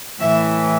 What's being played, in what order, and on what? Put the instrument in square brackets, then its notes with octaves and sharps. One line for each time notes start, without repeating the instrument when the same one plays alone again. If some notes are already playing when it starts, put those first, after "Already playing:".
[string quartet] A2 E3 E5